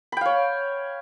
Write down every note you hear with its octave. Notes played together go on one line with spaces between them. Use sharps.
C#5 F5 G5 B5